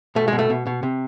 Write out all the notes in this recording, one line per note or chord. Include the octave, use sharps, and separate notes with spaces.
B2 A3
B2 G#3
A3
B2
B2
C3